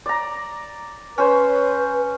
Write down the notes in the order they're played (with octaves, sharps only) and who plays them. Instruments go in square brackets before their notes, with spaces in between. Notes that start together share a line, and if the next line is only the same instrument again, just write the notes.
[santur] D5 A#5
[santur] C#4 C5 [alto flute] B4